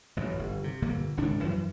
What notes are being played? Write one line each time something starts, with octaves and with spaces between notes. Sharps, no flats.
A1 F#2
G1
C3
G1 A#2 D3 A#3
G#1 C#2 G2 D4
F#2 E3